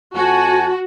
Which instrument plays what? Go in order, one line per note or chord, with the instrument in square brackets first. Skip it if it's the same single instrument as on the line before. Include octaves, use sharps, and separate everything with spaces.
[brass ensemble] F2 G#5 A5 [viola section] F#4